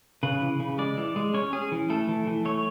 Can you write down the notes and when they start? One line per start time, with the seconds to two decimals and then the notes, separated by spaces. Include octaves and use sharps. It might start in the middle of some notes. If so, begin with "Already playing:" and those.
0.23 C#3 B4
0.41 E3
0.60 C#3
0.78 G#3 D5
0.97 E3
1.16 G#3
1.34 C#4 C#5
1.53 C#4 G#4
1.72 E3
1.90 A3 A4
2.09 E3
2.27 E3
2.45 A3 C#5